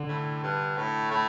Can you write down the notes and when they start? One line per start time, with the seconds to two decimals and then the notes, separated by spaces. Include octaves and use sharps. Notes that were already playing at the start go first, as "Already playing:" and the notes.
Already playing: D3
0.09 A2
0.44 G2
0.77 A2
1.11 A2